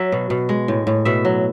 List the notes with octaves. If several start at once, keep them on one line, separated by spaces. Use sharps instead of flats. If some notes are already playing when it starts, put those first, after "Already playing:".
Already playing: F#3 E5
B2
B2
G#3
A2
A2
B2 E5
F#3